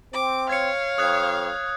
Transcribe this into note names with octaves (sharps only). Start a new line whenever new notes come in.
C4 D6
C#5 F5 G#6 C#7
F2 D#6 F#6 G#6